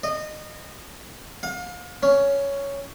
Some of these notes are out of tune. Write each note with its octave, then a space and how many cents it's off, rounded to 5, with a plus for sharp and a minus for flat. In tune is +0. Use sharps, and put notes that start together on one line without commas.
D#5 -25
F5 +35
C#4 +10